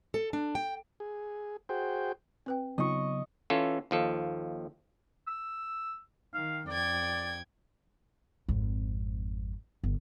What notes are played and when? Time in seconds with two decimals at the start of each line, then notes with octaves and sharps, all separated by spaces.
0.14 A4
0.33 D4
0.55 G5
1.00 G#4
1.69 F#4 G#4 C5 G5
2.46 C4 B4 G5
2.78 C#3 F#3 B3 D#4 F4 D#5 C#6
3.50 E3 C#4 F4 A4
3.91 D#2 F3 A4
5.27 E6
6.34 D#3 F5
6.68 F2 D5 G5 G#6
8.49 G#1 F2
9.84 G1